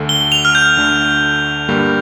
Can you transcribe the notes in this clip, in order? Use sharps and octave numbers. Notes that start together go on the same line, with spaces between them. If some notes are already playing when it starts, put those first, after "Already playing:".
Already playing: D2 D3 A3
G7
F7
F6
G6
D2 D3 A3
G2 D3 G3 A#3